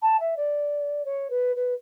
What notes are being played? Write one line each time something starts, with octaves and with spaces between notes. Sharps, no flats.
A5
E5
D5
C#5
B4
B4